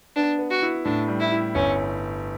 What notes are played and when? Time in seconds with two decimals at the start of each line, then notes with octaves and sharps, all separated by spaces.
0.16 B3 D4
0.39 B3
0.51 F#4
0.63 E4
0.85 A2 D4
1.08 G3
1.20 E4
1.32 E4
1.55 G1 C#4